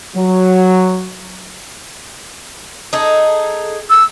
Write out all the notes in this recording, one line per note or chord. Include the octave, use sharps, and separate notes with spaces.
F#3
D#4 G#4 A4
E6